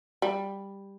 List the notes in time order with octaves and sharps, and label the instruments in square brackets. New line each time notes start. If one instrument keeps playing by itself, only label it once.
[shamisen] G3